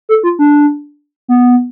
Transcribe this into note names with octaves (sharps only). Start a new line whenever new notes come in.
A4
F4
D4
B3